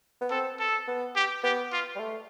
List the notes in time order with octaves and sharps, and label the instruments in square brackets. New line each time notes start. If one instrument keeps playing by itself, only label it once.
[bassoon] B3
[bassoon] C4 [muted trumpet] A4
[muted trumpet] A4
[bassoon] B3
[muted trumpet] G4
[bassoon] B3 [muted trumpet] G4
[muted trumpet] F4
[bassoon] G3
A3